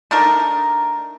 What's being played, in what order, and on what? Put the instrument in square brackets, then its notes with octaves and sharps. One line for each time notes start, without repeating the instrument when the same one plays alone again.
[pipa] A3 D4 D#4 A#4